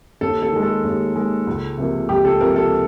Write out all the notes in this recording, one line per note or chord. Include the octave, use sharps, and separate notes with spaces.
D#2 A4
A4
D#3 G#3
A4
D#2
D#3 G#3
C#2
C3 F3 A#3
C#2 G4
A4
C3 F3 A#3 A#4
A4